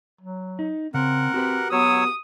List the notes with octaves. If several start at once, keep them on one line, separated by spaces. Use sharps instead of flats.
F#3
D#4
C#3 C4 A#4 F#5
C4 F#4 G4 B4
F#3 B3 C#5 D#6 E6